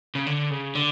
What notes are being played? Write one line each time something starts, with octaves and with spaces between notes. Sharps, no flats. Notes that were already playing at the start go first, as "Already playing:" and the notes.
C#3
D3
C#3
D3